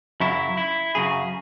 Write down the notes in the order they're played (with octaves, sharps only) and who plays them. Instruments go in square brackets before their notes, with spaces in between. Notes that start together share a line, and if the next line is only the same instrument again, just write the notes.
[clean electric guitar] F#2 C#3 F#3 E4
E4
F#2 C#3 F#3 G#4